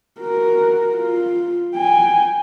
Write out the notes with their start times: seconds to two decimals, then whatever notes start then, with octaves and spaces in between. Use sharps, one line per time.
0.20 F#4 A#4
0.97 F4
1.75 G5 G#5